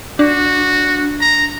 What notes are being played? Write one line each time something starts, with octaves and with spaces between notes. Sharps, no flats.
D4 F#4
A#5